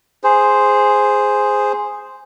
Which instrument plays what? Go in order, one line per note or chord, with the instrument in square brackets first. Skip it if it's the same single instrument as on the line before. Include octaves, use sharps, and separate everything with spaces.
[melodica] G#4 C5